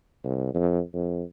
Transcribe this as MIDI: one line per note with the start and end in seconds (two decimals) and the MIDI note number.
0.24 0.52 36
0.54 0.80 41
0.93 1.23 41